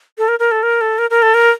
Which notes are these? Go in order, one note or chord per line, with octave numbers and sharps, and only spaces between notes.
A4
A#4
A#4
A4
A#4
A4
A#4
A#4
A4
A#4